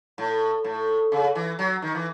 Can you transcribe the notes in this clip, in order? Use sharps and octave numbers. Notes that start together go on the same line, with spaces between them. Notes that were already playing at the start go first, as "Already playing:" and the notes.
A2
A2
C#3
E3
F#3
D#3
E3